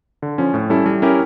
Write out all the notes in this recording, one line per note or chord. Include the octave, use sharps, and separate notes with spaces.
D3
F3 C#4
A2
G3 C#4 E4 A4
G3
C#4 E4 G4 A#4